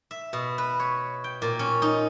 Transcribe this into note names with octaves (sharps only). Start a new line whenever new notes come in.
E5
B2
B4
C#5
G5
A#2
C#4
D#4